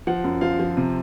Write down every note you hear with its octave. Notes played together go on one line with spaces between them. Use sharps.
F3 F#5
F#2
F3 F5
F3
C3